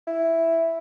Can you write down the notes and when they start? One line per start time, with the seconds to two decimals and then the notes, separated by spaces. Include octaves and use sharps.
0.07 E4